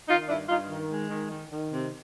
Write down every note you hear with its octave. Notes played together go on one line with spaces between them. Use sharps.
D#3 D#4 F4
G2 D4 E4
G2 D#4 F4
D#3
G#3
D#3
D#3
D#3
C3